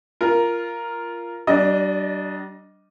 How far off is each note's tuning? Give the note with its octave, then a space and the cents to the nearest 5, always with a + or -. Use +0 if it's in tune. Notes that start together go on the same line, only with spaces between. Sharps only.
F4 -15 A#4 +0
G3 -45 D4 +0 D#5 +0